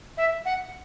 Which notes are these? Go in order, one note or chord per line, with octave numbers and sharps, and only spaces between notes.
E5
F#5